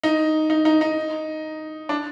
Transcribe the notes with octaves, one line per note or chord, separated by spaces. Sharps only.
D#4
D#4
D#4
D#4
D4